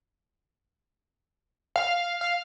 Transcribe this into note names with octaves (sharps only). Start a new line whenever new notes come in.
F5
F5